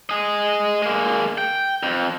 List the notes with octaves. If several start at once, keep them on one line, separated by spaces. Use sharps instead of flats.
G#4 D#5
G#3 A#3
G5
F2